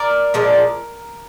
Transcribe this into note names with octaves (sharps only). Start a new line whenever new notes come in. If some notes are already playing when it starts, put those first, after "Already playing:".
Already playing: A#4 D5
A#2 F3 G#3 D4